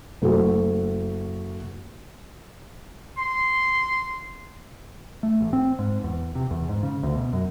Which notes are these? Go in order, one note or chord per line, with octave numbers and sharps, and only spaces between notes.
F#1 A3 F#4
C6
A3
A1
C4
G#2
E2
C3
E2
G#2
C#3
D2
B2
F#2